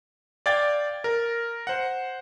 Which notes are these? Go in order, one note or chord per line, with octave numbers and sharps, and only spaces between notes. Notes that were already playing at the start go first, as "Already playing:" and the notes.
D5 F5 G5 G#6 A6
A#4
C5 F#5